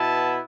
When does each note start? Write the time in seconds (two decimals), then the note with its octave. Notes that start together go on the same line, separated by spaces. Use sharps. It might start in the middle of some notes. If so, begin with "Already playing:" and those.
Already playing: B2 B3 E4 A5